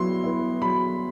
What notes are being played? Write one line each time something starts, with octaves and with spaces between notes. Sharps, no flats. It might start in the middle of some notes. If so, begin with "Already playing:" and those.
Already playing: F#3 B3 E4 C6
B3 E4
F#3 B5